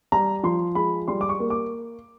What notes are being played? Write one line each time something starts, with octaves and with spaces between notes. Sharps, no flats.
G3 A#5
F3 C6
G#3 B5
G3 C6
D6
C#6
A#3
D6